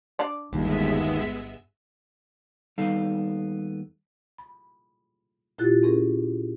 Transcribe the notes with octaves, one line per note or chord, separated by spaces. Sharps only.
D4 D5
G1 D#2 G#3 B3 E5
D#2 G3 B3 D#4 A4 F5
B5
A#2 E4 F4 G4 F#6 A6
C4 C#4 G#4 A#4